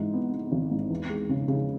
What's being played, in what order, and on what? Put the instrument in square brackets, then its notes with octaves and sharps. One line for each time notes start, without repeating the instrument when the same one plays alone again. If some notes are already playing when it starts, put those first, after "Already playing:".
Already playing: [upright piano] G#2 E3
B3
B3
G#1
G#2
E2
G#3
C#3
C#3